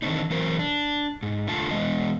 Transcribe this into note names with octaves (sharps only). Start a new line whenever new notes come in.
D#3 E3 C4 D4 D#4
E3 F#3 C4 A#4 C5
D4
G#2
D3 A3 F4 A5
E2 B2 F3 G#3 D#5